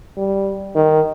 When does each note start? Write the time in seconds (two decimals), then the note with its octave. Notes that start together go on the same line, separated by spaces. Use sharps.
0.17 G3
0.76 D#3